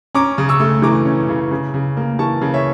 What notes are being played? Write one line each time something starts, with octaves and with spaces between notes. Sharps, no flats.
C#4 A#5 D6
C#3
C#6 E6
A3
E3 A#5 D6
C#4
C#3
C#3
C#3
A#3
E3 A5 C#6
C#3
C#5 E5